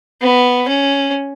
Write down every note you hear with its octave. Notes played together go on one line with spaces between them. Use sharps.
B3
C#4